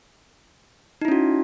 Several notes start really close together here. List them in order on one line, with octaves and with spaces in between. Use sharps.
D#4 E4 C#4 F#4